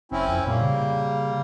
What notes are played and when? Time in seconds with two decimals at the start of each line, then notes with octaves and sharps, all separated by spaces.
0.12 F#1 C4 C#4 E4
0.29 F2
0.47 A#2 G3 A#3
0.61 C#3